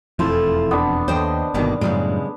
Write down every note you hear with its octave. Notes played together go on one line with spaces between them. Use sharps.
E1 F2 A3 E4 F4 C5
B3 D4
D#2 C5 D#5 G5
G1 B2 D#3 G3 A#3
F#2 A2 C#3 G3 G#3